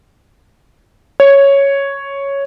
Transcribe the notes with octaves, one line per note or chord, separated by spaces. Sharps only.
C#5